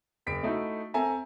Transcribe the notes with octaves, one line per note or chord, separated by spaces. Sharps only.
F#1 B6 D7
A3 D#4 E4 F#4
C4 A4 E5 G#5 A#5